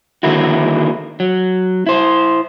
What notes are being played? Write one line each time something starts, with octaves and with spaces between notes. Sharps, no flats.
D3 D#3 G#3 A#3 E4 F#4
F#3
E4 C5